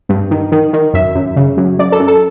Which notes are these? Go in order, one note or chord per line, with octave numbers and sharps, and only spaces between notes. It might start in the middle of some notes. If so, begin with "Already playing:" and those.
G2
D#3
D#3
D#3
F#2 E5
F#2
C#3
F#2
F#2 D5
A4
F#2
A4